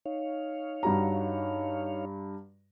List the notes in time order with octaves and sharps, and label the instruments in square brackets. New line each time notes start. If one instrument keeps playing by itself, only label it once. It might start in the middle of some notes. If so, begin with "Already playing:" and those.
[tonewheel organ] D#4 C#5 F5
[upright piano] G2 F#4 A#5